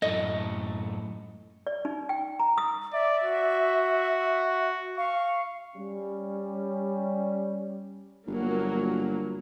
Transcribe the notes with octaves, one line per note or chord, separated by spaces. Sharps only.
F#2 A2 A3 D#5
D5
D#4
G5
A#5
D#6
D5 E5
F#4
F5 C#6
G3 C#4
G1 F#3 A#3